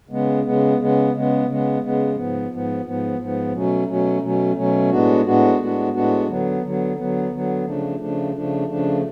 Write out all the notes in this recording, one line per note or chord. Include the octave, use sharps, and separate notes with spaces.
C#3 G#3 B3
C#3 G#3 B3
C#3 G#3 B3
C#3 G#3 B3
C#3 G#3 B3
C#3 G#3 B3
G#2 F3 B3
G#2 F3 B3
G#2 F3 B3
G#2 F3 B3
B2 F#3 A3 C#4
B2 F#3 A3 C#4
B2 F#3 A3 C#4
B2 F#3 A3 C#4
A2 G#3 B3 D4 F#4
A2 G#3 B3 D4 F#4
A2 G#3 B3 D4 F#4
A2 G#3 B3 D4 F#4
D3 F#3 B3
D3 F#3 B3
D3 F#3 B3
D3 F#3 B3
C#3 F3 A3 D4
C#3 F3 A3 D4
C#3 F3 A3 D4
C#3 F3 A3 D4